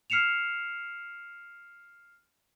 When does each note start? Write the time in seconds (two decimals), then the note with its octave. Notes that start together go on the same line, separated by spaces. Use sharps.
0.10 F6 C7 C#7 E7 F7